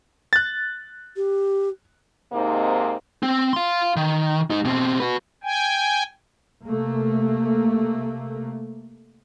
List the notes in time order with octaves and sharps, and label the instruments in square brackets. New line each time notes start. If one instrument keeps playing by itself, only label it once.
[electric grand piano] F#6 A6
[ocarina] G4
[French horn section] G#2 C3 A#3 C4 D#4
[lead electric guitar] C4
F5 C6
D#3
G#3 D#4
B2 C4
F#4 B4
[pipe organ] G5 G#5
[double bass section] C3 A3 A#3